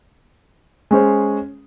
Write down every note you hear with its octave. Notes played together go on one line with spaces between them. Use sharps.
G#3 C#4 G#4 C5